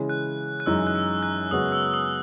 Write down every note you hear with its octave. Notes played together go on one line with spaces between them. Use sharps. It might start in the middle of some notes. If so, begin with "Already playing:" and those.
Already playing: C#3 E3 G#3
F#6
F#6
F#2 E3 G#3 D#4 E6
F#6
E6
F#6
F#2 C#3 G#3 B3 F#4 D#6
E6
D#6